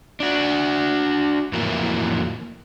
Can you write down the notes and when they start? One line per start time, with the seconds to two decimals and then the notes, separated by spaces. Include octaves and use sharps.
0.20 D4 F#4
1.53 F2 A2 E3 A#3 F#4 A#4